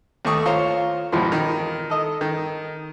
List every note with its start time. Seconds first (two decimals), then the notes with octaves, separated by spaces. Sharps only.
0.25 D#2 A3 C#6 D#6
0.46 F4 C5 C#5 A#5
1.12 G#1 E2 B2 F3 C6
1.32 D#3
1.90 A4 D#5
2.21 D#3